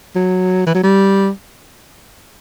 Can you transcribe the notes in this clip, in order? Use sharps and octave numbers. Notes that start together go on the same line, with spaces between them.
F#3
E3
F#3
G3